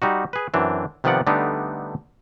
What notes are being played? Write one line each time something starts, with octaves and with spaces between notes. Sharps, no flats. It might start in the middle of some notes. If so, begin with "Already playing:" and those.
G3 D#4 F#4
G#4 B4
F#2 E3 C4 D4
C3 D#3 F3 B3 D5 F#5
D3 G3 A3 B3 D4 D#4